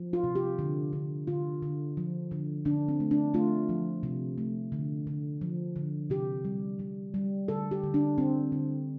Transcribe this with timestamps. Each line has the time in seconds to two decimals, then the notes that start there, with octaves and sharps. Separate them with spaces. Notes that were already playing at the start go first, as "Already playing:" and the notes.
Already playing: F3
0.13 F4
0.24 C3
0.35 G4
0.59 D3
0.93 D3
1.27 D3 F4
1.63 D3
1.97 F3
2.31 D3
2.65 D3 D4
2.88 C4
3.00 A3
3.11 D4
3.34 A3 F4
3.69 F3
4.03 C3
4.38 A3
4.72 D3
5.07 D3
5.41 F3
5.76 D3
6.10 C3 G4
6.45 G3
6.79 G3
7.14 G3
7.48 D3 A4
7.71 G4
7.84 D3
7.94 D4
8.18 D3 C4
8.52 D3